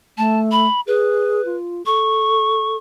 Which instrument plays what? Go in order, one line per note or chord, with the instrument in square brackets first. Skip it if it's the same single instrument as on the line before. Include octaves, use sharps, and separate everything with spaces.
[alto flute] A3 [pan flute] A5
[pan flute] B5
[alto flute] G#4 [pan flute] B4
[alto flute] F4
[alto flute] A4 [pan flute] C#6